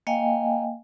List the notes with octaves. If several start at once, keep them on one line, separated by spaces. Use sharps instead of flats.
A#3 D#5 F5 G5 G#5